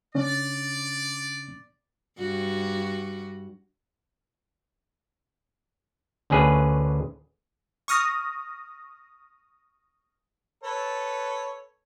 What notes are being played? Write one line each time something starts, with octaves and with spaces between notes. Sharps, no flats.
C#3 C#4 D4 D5
G2 F#4
D2 D3 C#4 G#4 B4
C#6 D#6 F6 A#6
A4 B4 C#5